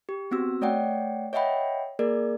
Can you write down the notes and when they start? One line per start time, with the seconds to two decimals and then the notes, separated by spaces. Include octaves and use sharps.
0.09 G4
0.31 B3 C4 F#4 E6
0.62 A3 C#5 D5 F#5 G5
1.33 C#5 D#5 E5 F#5 G5 B5
1.99 A#3 G#4 A#4 D5